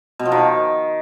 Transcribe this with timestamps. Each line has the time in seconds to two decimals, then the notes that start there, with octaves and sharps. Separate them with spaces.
0.19 B2
0.26 F3
0.32 D#3